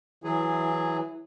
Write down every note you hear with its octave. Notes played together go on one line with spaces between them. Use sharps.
E3 F#3 E4 G#4